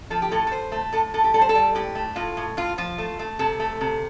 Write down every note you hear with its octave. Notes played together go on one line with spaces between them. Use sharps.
F3 A4
G4
A2 A4
A4
A2 C5
A3
A2 A4
A2 A4
G4
G3 A4
C5
A4
G3
A2 G4
A3
A2 F4
A2
A2 F4
F3 F4
A3
A3
C3 A4
A3
C3